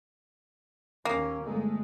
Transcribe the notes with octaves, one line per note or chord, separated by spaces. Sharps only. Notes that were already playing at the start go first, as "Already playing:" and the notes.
D#2 A#3 C#4
G1 G#3 A3